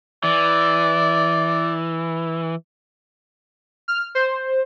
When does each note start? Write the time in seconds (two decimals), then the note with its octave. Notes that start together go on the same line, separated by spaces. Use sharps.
0.24 E3 D5
3.88 F6
4.15 C5